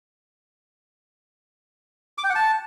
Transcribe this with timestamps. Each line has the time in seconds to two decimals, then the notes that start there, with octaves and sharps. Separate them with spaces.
2.18 D6
2.24 G5
2.30 F#5
2.35 A5